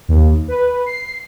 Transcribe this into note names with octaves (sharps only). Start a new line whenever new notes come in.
D#2
B4
C7